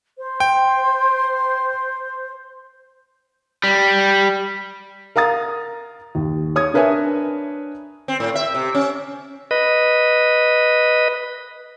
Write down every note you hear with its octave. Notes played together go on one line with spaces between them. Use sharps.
C5
G5
G3
A#4 F5 A#5 D#6 A6
D#2
C#5 D#6 G#6
D4 A#4 B4 C#5 E5 G#5
C4
A2
E5
C3
C#4
B4 D#5